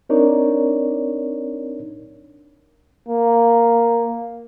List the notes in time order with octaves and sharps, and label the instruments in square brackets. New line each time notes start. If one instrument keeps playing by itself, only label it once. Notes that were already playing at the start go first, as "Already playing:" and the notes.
[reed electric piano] C4 D4 D#4 A#4 C#5 D5
[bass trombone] A#3